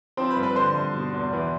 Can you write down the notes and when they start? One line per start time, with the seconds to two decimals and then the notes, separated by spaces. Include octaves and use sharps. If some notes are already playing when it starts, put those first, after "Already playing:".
0.17 F3 C4 C5
0.30 B4 B5
0.36 G2
0.43 B4 B5
0.56 D3 C5 C6
0.75 G2
0.94 B2
1.13 E2
1.33 E3